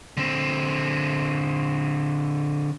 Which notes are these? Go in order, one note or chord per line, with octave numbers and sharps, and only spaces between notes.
D3 C4